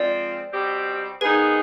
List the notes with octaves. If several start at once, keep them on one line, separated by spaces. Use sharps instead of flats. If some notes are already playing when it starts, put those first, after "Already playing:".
Already playing: F3 G#3 C4 F4 D5
B2 G3 C4 G4
D#3 B3 D#4 G#4 B4